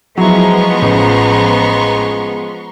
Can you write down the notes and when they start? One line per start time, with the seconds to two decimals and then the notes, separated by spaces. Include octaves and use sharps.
0.18 F3 F#3 G#3 B3 E4 A#5 C6 C#6
0.82 A1